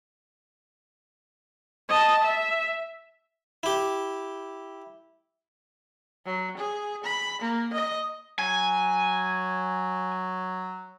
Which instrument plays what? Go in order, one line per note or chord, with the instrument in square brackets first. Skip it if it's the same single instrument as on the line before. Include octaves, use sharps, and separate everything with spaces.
[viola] D#5 A5
E5
[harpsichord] E4 G4
[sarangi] F#3
G#4
B5
A#3
D#5
[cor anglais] F#3 [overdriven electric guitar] G#5